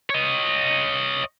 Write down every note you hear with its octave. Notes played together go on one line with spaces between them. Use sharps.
C#5 D#5